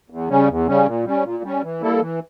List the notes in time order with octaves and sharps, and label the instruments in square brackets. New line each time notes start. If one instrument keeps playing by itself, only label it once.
[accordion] E2
C#3 G3 C#4
E2
C#3 G3 C#4
A#2
G3 C#4
A#2
G3 C#4
E3
G3 A#3 E4 A4
E3